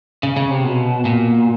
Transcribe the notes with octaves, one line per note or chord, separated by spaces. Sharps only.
C#3
C#3
C3
B2
A#2